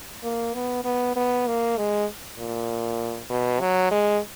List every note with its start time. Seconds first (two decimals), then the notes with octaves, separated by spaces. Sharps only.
0.23 A#3
0.54 B3
0.84 B3
1.16 B3
1.47 A#3
1.77 G#3
2.38 A#2
3.30 B2
3.60 F#3
3.91 G#3